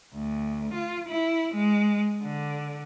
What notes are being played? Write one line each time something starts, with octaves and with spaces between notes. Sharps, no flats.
D2
F4
E4
G#3
D3